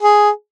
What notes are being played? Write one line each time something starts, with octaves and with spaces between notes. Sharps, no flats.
G#4